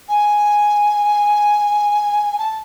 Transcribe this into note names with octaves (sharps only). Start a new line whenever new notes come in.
G#5
A5